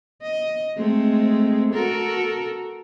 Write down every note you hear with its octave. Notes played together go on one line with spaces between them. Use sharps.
D#5
G#3 A3 C4
F#4 A4 A#4